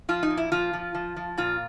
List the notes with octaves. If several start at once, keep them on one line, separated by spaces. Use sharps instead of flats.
F3 F4
D#4
A#2
E4
F3 F4
F3
F3
F3
A#2 F4